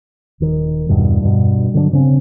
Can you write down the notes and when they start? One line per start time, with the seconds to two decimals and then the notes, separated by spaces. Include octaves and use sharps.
0.40 D#1 D#3
0.89 E2 G2 B2
1.22 G2 B2
1.74 D3 F#3 B3 D4
1.93 C#3 C4 C#4